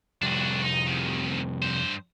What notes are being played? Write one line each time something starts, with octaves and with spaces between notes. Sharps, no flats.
F2 C3 G3 D4 F#4
D#4
E2 D#3
G2 C5